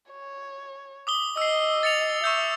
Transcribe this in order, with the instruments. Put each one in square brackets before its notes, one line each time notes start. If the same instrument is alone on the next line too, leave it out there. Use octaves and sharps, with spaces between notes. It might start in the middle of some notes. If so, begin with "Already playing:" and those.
[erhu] C#5
[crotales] D6 D#6 G7
[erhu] D#5 [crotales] E6 C7
[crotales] A6 C#7 F7
[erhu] E5 [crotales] C#6 E6 G6